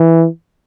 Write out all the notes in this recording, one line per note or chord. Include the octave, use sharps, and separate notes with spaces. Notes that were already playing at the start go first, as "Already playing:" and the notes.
Already playing: E3